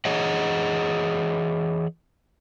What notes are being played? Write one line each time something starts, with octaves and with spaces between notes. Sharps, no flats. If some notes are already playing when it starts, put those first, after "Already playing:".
E3 G#4 C#5 D#5 F#5